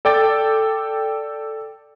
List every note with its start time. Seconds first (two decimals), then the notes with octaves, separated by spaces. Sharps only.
0.05 A4 D5 G5 D6 A6